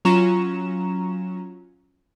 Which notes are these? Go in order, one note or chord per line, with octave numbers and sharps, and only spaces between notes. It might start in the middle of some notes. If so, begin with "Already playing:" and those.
F#3 C#4 F4 A#5 C#6 E7